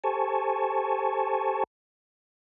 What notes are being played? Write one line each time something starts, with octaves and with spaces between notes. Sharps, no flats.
G4 A4 C5 G#5 A5 C#6